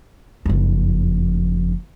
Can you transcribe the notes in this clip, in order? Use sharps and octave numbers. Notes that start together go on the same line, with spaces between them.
F#1 F2